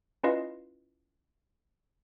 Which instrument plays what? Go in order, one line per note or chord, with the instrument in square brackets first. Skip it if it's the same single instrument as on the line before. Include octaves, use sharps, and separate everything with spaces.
[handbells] C#4 E4 F4 B4 D#5 F5